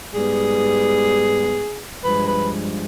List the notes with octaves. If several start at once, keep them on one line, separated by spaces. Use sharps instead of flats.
G#2 G3 B3 G#4
G2 F3 G#3 B4
B4